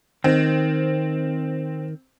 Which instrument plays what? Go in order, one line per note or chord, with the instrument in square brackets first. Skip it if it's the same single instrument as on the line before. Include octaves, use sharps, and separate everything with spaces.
[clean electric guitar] D#3 [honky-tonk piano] C4